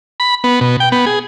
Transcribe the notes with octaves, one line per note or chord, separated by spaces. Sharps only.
B5
B3
B2
G5
B3
G#4